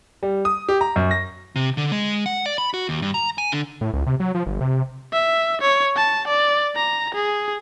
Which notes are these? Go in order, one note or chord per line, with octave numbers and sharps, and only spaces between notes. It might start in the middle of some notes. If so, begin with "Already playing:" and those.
G3
D#6
G4
A#5
F#2
A#6
C3
D3
G#3
F#5
D5
B5
F#4
D#2
G2
A#5
G#5
D3
A2
C#2
C3
F#3
F3
G1
C3
E5
C#5
A5
D5
A#5
G#4